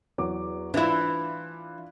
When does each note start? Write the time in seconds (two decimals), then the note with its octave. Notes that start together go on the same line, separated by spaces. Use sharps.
0.18 E2 F#3 D6
0.74 E3 D4 E4 F4